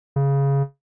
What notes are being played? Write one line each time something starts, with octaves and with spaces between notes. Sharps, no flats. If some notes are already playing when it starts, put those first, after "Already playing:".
C#3